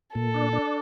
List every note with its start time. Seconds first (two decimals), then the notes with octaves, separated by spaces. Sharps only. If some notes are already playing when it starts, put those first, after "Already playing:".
0.15 A#2 A4
0.34 D4
0.53 D4